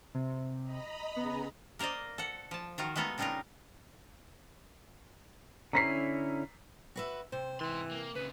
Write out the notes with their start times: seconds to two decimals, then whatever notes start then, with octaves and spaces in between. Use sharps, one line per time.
0.14 C3
0.62 D#5 A#5 B5
1.16 C#3 B3 G#4 A#5
1.79 A#3 A#4 C5 D5 D#5
2.18 A4 F#5
2.51 F3 A5
2.78 D#3 F4 F#4
2.96 G#3 A3 B3 A4 A#4
3.18 C#3 G3 D4 D#4 F4 A#4
5.73 D3 C#4 E4 A#5 B6 C7
6.96 F#4 B4 E5
7.32 C3 C5
7.60 G#2 E3 C6
7.91 A#3
8.15 A#2 C#3 B4